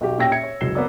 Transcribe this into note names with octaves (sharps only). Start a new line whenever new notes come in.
B1 F#4 G4
A#2 C#4 G4 G5 E6 A#6
E5 G#6 C#7
C#5
F#1 C#2 F#3 C7 E7 G7
B3 A#4 C#5 D5 E6